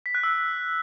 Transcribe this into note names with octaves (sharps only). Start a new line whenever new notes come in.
B6
F#6
E6